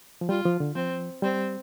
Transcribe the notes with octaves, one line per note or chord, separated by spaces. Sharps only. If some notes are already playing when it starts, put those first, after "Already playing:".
F3
G3 F4
F3
D3
F3 C4
G3 C4